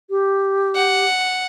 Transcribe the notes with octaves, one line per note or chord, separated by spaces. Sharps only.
G4
F#5